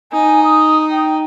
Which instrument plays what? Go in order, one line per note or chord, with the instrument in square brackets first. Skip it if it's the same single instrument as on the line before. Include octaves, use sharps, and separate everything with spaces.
[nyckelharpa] D#4 [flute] G#5
[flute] D#6
G5